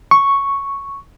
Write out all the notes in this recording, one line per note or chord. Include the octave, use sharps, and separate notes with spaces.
C#6